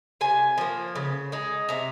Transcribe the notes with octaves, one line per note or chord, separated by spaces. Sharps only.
C3 G#5
F3 A#3
C#3
G#3 D#4
C3 A#5